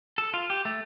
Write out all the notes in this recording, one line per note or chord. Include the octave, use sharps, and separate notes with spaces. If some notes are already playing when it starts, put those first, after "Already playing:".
A4
F4
G4
A3